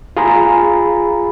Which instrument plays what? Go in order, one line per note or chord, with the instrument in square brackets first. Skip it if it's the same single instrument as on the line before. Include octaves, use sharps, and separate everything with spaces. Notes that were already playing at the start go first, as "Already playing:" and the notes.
[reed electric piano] F4 G#4 A#5 B5